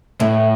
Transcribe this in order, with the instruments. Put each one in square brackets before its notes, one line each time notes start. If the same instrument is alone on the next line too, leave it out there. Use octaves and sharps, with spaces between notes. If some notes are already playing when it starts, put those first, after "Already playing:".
[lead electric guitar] A2 [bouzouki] E3